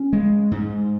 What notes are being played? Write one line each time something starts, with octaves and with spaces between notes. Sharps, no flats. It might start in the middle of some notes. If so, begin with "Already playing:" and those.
Already playing: C#4
G#3
G#2